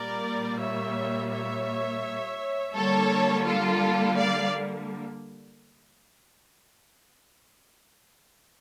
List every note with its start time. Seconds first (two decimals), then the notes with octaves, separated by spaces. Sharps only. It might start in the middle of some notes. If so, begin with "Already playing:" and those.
Already playing: A#2 G3 A#3 A#4 D5
0.60 C#5 E5
1.31 C#5 E5
2.74 D3 G3 A#3 A4 C#5
3.45 F4 A4
4.16 D5 F5